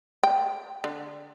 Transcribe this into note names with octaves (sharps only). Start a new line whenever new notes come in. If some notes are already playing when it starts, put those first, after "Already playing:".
G5
D3